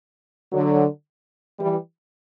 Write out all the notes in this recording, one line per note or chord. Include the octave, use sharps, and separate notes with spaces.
D3 F#3
E3 G3